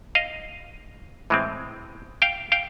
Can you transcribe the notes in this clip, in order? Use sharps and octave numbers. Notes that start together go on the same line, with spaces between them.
D#5 F5
A2 E3 G#3 C4
F5 G5
F5 G5